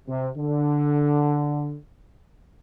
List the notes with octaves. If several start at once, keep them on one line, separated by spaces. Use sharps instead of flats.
C3
D3